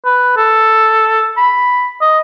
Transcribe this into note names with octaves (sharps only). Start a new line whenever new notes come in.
B4
A4
B5
D#5